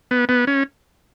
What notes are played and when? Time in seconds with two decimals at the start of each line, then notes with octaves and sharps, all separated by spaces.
0.11 B3
0.29 B3
0.47 C#4